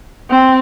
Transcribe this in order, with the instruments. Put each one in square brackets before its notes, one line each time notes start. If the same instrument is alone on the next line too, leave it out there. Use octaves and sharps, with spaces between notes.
[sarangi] C4